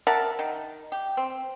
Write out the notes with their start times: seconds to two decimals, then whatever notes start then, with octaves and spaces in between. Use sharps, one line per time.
0.07 A#4 E5 F#5 A5
0.39 D#3
0.92 G4
1.17 C4